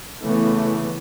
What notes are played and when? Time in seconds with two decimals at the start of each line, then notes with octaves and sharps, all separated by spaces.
0.23 C#3 E3 A3 B3